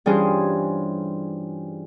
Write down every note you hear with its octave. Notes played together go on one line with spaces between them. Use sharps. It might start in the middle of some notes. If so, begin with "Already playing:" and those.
G2 E3 C#4 F4 G#4 C5